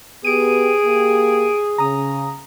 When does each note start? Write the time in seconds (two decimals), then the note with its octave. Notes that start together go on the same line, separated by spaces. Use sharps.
0.25 B3 G4 G#4 D7 D#7
0.85 A#3 G4
1.78 C#3 A#5 D#6